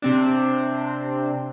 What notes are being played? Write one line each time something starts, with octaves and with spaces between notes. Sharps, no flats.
C3 C4 D4